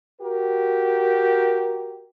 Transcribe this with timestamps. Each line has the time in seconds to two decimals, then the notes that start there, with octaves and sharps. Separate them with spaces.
0.21 F#4 G4 A#4